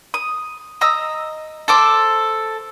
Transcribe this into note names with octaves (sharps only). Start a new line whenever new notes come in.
D#6
D#5 A#5 E6
A4 C5 D6